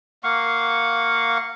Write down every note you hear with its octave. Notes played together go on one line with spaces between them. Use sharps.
A#3 F5 F#5 C#6